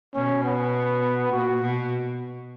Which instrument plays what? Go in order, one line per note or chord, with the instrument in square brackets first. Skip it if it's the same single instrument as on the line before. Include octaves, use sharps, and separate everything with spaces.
[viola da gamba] B2 [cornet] C#4
[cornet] B3
[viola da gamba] A#2 [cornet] F#4
[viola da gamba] B2